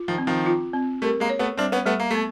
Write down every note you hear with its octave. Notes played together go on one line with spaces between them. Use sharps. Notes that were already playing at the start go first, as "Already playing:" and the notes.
Already playing: F4
D#3 F3
C4
D#3 F3
F4
C4
G3 A3 A#4
G#3 A#3
C#5
A3 B3
G3 C4 D4
B3 C#4
G3 A3 B3
A#3
A3 B3